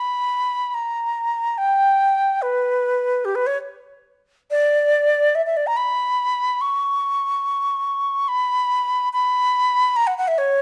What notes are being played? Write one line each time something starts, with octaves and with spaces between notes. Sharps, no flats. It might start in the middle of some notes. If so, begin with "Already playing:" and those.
Already playing: B5
A#5
G5
B4
G4
B4
C#5
D5
E5
E5
D5
A#5
B5
C#6
B5
B5
A#5
F#5
F#5
E5
C#5